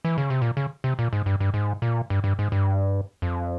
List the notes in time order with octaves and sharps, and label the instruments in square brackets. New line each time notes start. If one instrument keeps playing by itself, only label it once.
[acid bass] E3
C#3
C3
A#2
C#3
C3
A#2
G#2
G2
G2
G#2
A#2
G2
G2
G#2
G2
F2